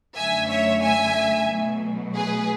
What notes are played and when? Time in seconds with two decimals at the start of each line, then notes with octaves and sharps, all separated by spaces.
0.16 F#2 D3 A3 E5 G#5
0.49 C#5 E5
0.82 E5 G#5
1.48 B2 F#3 A3
2.15 G#4 B4